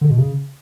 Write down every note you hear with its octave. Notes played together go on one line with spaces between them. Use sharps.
D3
B2
C#3